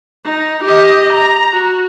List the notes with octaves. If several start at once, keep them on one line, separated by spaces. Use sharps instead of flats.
D#4
G4 D#5
A#5
F#4